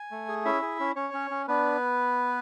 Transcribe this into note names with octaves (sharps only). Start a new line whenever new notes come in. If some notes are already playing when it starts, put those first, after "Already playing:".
Already playing: G#5
A3
G#4
C#4 E4 E5
G#4
C#4
C#4 C#5
C#4
C#4
B3 D4 B4